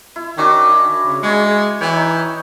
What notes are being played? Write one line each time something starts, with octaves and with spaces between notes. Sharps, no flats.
E4
D#3 C#4 D4 F#4
C#3
G#3 G#4 G#5 C#6
E3 C#5 G5
D#4